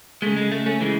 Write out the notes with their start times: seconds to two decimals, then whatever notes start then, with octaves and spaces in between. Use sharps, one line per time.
0.22 C#3 G#3 A3
0.37 G#3
0.52 A3
0.66 A3 C#4
0.80 C#3 E3 G#3